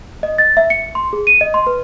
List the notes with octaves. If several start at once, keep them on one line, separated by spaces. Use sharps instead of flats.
D#5
A6
E5
C#7
C6
G#4
D#7
D#5
C6
B4